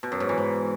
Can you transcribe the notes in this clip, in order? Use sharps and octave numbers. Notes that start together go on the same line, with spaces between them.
B2
F#2
G#2
E3
G#2